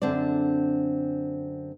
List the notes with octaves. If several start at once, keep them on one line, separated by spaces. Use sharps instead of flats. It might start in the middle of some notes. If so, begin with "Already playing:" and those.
F#2 D3 C4 D4 D5